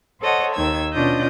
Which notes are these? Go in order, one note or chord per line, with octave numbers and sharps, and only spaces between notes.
A4 C5 C#5 D#5 F#5
D#2 D#3 E6 G#6
B2 C#4 D4 F4 D#5 G6